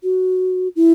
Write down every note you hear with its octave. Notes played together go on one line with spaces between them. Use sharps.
F#4
E4